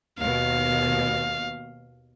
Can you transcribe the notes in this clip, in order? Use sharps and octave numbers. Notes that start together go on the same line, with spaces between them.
D#2 B2 F5